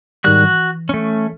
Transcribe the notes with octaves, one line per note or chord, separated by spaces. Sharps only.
G#2 D#3 G3 F#4 F#6
E3
A3 C#4